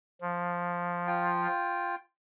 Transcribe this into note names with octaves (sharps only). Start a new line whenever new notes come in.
F3
F4 G5